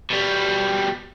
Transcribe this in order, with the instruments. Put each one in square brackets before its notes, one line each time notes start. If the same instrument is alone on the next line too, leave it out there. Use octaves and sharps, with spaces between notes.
[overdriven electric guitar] B2 G3